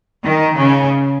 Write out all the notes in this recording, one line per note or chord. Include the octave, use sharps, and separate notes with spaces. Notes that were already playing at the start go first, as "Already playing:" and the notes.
D#3
C#3